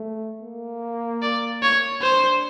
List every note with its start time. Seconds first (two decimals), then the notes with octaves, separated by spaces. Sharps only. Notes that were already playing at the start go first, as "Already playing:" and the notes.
Already playing: A3
0.42 A#3
1.22 D5
1.62 C#5
2.02 D4 C5